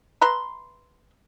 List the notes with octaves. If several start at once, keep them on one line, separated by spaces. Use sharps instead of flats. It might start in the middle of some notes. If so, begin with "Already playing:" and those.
B4 E5 A#5 C6